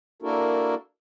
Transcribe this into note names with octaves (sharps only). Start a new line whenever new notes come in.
A#3 D4 E4 F#4 A4 A#4